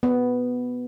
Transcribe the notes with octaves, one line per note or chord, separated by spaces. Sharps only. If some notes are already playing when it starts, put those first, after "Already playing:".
B3